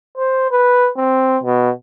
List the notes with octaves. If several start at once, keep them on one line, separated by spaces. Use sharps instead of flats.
C5
B4
C4
B2